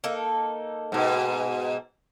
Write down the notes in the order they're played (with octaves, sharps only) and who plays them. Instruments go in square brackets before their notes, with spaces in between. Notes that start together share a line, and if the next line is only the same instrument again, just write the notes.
[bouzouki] A#3 D#4 A4
[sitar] G#2 B2